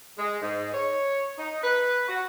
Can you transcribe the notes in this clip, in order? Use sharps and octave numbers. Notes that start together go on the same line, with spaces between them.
G#3
G#2
C#5
D#4
B4
F#4